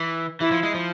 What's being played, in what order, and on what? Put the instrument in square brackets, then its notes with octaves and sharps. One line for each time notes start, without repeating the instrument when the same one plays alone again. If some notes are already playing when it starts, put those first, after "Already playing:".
Already playing: [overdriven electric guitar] E3
[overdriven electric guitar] E3 [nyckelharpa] E4
[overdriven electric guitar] F3
G#3
F3